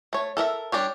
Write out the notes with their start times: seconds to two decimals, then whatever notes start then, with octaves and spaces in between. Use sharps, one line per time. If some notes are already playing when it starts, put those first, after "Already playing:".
0.13 A3 C#5
0.37 A4 A#4 D#5 E5
0.72 G3 D4 G4 C#5